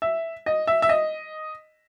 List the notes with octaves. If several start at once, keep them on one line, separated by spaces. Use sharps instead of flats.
E5
D#5
E5
E5
D#5